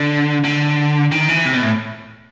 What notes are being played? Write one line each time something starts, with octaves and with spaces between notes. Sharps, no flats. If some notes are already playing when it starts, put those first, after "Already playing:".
Already playing: D3
D3
D#3
E3
C3
B2
A2